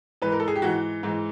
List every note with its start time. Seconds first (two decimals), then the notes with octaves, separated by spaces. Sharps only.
0.22 G#2 E3 B4
0.32 A#4
0.40 A4
0.48 G#4
0.56 G4
0.62 G#2 E3 F#4
1.03 G#2 E3